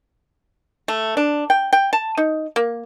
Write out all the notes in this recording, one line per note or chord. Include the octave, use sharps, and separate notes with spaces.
A3
D4
G5
G5
A5
D#4
A#3